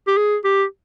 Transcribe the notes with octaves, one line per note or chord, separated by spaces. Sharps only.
G4
G#4
G4